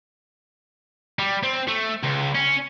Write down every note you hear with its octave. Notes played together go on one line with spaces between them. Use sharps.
G3
C4
A3
C#2
C#4